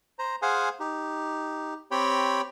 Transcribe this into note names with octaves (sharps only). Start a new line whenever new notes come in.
C5 A#5
G#4 C5 F5 F#5 G#5
D#4 G4
C4 G4 C#5 G5 B5